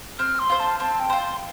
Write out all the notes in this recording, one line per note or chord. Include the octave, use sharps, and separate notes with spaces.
C4 F6
C6
F4 C5
A5
C4 A5
G5
F4 C5